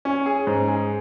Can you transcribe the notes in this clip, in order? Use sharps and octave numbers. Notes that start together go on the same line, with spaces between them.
C#4
G#4
G#2
G#4